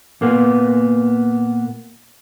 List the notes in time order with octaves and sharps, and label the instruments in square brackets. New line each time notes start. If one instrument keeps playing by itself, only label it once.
[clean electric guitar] A#2 A#3 B3